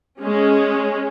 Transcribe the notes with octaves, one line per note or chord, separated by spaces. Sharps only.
G#3 C#4